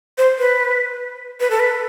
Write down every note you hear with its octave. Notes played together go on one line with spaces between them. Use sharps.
C5
B4
B4
A4
B4